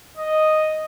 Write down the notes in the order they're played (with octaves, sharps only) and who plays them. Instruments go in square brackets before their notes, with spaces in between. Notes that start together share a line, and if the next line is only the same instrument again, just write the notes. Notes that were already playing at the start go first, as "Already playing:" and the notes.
[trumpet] D#5